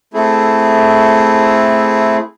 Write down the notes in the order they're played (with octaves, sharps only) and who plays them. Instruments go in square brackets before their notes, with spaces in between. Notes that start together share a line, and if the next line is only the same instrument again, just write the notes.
[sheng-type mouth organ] A3 C4 E4 G#4 A4